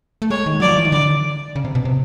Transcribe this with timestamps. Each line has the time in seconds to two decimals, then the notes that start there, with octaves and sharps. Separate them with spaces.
0.22 A3
0.30 G#3 C#5
0.46 D#3
0.60 F#3 D5
0.68 F3
0.76 E3
0.85 D#3
0.92 D3 D5
1.56 C#3
1.65 C3
1.75 B2
1.85 C3